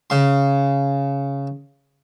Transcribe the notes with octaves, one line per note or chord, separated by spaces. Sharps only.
C#3 C6